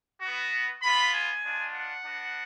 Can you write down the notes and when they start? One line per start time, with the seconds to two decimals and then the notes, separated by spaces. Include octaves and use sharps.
0.21 B3 F#4
0.82 B3 F4 B5
1.13 G#5
1.44 G#3 D4 F4
1.74 F#5
2.04 B3 D4 F#4